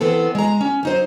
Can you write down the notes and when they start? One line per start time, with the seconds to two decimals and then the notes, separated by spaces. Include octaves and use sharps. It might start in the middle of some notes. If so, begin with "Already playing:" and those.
0.01 E3 B3 C4 A4
0.35 G#3 A#5
0.61 C#4
0.83 F#3 D#4 C5